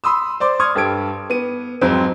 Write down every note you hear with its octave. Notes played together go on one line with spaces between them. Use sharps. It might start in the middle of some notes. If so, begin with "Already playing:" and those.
B5 C6 D#6 E6
C5 D5 C6 D6
C6 C#6 D#6 F6 G#6
G2 G4 A4 G#6 D7
B3 D#7
F2 G#2 F#3 C4